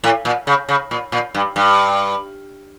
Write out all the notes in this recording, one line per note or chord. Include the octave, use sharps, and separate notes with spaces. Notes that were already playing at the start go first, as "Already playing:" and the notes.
A2
A#2
C#3
C#3
A#2
A#2
G2
G2